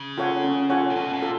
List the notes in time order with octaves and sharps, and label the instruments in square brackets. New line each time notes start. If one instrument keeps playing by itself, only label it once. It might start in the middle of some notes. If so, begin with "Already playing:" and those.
Already playing: [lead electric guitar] C#3
[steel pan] F4 A4 C#5 F#5
C#4
F4 A4 C#5 F#5
[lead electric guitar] A#2
[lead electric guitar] B2 [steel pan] C#4
[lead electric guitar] A#2
[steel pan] F4 A4